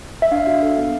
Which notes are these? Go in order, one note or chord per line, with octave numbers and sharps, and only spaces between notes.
E5
D4 F5
F#4
A4
B3